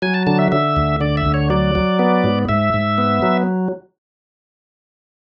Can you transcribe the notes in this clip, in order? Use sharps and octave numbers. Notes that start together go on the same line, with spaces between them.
F#3 G#5
A5
D3 A5
E5
D3 E5
D2
D3 D5
E5
D2
C#5
F#3 D5
F#3
B3
G#2
G#2 E5
G#2
B3
F#3